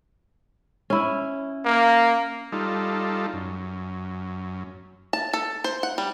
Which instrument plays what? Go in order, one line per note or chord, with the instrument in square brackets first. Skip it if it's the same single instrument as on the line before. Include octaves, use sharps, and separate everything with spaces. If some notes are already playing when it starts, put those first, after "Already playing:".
[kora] C#4 E4
[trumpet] A#3
[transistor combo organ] G3 D#4 F4 A4
F#2
[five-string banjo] A5
A4
C5
F#5
G3